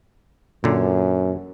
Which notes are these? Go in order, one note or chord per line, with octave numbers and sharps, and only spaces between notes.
F#2 A#2 D3